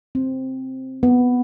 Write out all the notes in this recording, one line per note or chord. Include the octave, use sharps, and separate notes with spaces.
C4
B3